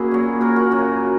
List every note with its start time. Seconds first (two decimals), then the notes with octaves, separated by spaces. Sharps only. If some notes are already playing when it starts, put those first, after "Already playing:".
Already playing: A#3 C#4 E4 F#4 G#4
0.11 A#2 F#3
0.41 F#4 A#4
0.56 F#4 A#4
0.71 F#2 C#3 F#3